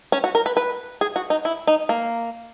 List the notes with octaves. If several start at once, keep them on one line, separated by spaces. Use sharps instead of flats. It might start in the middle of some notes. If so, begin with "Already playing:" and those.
C#4
F#4
A#4
B4
B4
G#4
F#4
D#4
E4
D#4
A#3